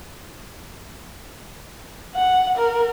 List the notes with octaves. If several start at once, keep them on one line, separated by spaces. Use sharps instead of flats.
F#5
A#4